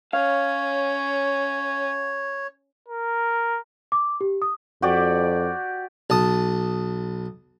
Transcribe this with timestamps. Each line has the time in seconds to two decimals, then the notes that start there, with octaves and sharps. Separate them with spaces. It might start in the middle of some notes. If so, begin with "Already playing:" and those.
0.13 C#4 C#5 F5
2.88 A#4
3.92 D6
4.21 G4
4.42 D#6
4.82 F2 F#4 G4 D5
6.10 B1 A5 D#6